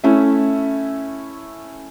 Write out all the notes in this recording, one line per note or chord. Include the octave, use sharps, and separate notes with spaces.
A3 C#4 E4 E5